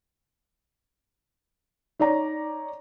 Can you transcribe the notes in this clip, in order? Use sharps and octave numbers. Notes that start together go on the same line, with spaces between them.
D#4 C#5 D5 A#5